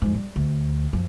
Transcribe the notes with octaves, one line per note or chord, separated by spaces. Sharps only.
F2 G#2
G3
D2
F#2 F3